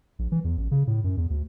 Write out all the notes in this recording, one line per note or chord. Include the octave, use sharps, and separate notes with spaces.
A#1
E3
E2
A1
C#3
A2
F#2
E2
D2